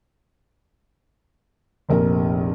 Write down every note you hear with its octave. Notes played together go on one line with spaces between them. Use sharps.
F1 A#1 A#4